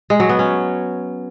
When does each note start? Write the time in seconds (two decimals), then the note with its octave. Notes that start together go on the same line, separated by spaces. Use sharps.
0.10 G#3
0.20 F#3
0.29 B3
0.39 C#4